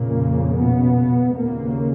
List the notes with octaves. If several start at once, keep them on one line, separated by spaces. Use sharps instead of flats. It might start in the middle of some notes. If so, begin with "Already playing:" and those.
Already playing: F2 A#2 C#3 A#3
B2 B3
D#2 A#2 C#3 A#3